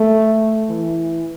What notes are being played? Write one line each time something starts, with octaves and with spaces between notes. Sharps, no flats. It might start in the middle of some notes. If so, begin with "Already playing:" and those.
Already playing: A3
E3